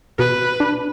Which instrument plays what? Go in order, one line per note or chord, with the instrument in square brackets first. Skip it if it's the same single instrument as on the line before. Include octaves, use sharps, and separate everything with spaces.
[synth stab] B2 [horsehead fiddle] B4
[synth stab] D4